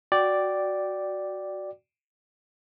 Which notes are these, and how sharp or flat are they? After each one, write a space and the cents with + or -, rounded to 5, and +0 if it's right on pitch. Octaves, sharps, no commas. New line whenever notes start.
F#4 +0 D5 +0 G5 -10